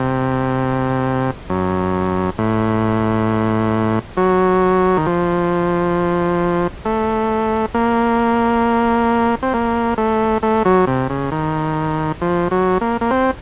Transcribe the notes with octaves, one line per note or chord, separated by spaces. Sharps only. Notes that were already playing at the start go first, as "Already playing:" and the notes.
Already playing: C3
F#2
A2
F#3
D#3
F3
A3
A#3
C4
A#3
A3
A3
F#3
C3
C#3
D#3
F3
F#3
A#3
A#3
C4